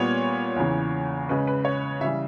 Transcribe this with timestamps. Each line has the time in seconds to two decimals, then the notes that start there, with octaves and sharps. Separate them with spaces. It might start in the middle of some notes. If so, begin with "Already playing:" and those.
Already playing: A#2 G3 B3 C#5
0.56 E2 C#3 E3
1.29 C#3 G#3 C#4 B4
1.47 B4
1.65 C#5
2.01 C#3 E3 G3 E5